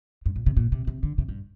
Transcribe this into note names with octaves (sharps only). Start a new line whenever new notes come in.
G2
A#2
C3
A#2
C3
C3
D3
C3
G2